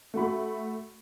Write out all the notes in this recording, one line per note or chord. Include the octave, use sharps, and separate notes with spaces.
A3 F#4 B5